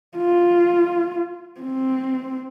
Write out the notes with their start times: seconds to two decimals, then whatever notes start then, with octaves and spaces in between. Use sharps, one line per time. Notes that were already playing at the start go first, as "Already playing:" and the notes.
0.18 F4
1.60 C4